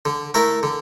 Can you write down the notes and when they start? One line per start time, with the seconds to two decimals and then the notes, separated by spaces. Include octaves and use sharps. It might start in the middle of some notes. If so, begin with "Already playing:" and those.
0.05 D3
0.34 A3 E4 A#4
0.63 D3